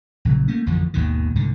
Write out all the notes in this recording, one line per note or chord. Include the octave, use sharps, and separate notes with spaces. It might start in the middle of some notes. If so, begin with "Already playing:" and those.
A#1 C#3 F#3
A3 A#3 C#4
A1 F2 D3 F3
G#1 D#2 B2 D#3
C2 G#2 B2 D3